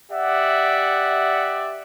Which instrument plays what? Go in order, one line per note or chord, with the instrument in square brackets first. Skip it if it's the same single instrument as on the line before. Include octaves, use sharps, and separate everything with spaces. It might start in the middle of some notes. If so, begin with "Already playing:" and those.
[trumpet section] G4 D5 E5 F#5